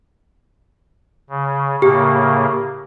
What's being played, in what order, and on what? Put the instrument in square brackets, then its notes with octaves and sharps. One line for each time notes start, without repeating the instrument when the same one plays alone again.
[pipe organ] C#3
[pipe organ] A2 C#3 A#3 [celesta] G4